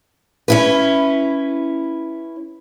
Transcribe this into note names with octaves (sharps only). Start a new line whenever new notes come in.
C#4 E4 B4